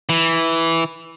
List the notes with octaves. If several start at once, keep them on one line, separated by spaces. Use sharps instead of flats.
E3